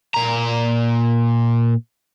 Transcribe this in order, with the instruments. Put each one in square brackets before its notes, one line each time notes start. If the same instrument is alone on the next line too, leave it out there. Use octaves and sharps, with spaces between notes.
[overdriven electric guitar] A#2 A#5